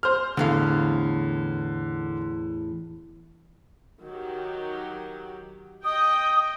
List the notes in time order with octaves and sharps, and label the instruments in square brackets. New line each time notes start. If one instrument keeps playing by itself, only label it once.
[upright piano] C5 F6
[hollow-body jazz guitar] E2 A2 F5 [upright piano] D3
[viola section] D#3 F#3 G4
[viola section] D#5 G5 [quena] D#6